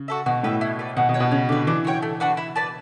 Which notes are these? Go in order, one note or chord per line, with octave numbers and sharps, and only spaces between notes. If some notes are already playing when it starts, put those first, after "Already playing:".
Already playing: C#3
F#4 A4 E5
B2 F#4
A2 B4 E5 G5
E4
B4 D5
B2 F#4
B2
C#5 F#5
B2
C#3 C#4
D3 G4 B4
E3 D4
F#4 C#5 G5
A3
D4 F#4 B4
E4
B4 D5 A5